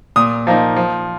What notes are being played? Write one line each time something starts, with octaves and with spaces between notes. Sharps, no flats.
A#2 D#6
F3 A#3 D#4
F3